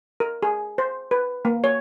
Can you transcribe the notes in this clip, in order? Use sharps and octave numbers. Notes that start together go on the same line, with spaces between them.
A#4
G#4
C5
B4
A#3
C#5